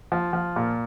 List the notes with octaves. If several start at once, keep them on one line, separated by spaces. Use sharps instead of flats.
F3
F3
A#2